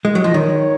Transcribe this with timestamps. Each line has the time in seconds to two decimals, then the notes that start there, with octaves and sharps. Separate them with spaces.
0.05 G#3
0.15 F#3
0.22 F3 D#5
0.34 D#3 C#5